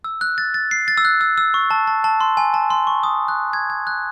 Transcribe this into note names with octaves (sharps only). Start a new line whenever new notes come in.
E6
F#6
A6
A6
C7
A6
E6
F#6
E6
E6
C#6
A5
A5
A5
C6
G#5
A5
C6
C#6
D#6
F#6
G#6
G#6
F#6